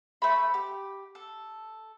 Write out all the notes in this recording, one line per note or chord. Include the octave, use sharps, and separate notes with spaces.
A3 C5 B5
G4
A4